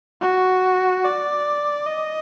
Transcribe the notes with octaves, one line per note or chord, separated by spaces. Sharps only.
F#4
D5
D#5